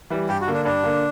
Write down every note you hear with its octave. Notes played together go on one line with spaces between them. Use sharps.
E3 G3
G2 G4
F#4
D3 A#3
D4
G2 D4
D3 A#3